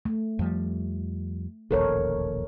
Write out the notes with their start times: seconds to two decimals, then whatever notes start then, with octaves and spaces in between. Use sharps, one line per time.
0.05 A3
0.39 F2 F3 G3
1.71 E1 A#1 D#2 A4 A#4 C#5